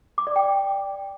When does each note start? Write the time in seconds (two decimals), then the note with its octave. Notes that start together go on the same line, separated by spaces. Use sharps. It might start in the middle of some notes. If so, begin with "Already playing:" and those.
0.18 D6
0.27 D5
0.36 G5